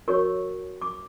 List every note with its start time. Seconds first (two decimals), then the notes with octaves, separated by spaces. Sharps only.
0.08 F#4 A#4 C#5 C#6
0.82 D6